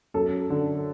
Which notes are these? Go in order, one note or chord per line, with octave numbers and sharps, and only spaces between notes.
F#2 A4
D3